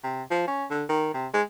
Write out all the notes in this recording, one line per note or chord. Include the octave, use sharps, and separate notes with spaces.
C3
F3
C#4
D3
D#3
C3
G#3